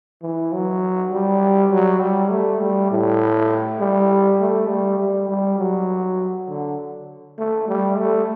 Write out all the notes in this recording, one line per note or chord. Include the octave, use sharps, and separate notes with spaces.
E3
F#3
G3
F#3
G3
A3
G3
A2
G3
A3
G3
G3
G3
F#3
D3
A3
G3
A3